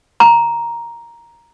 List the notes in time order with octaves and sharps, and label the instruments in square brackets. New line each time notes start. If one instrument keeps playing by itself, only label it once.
[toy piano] A#5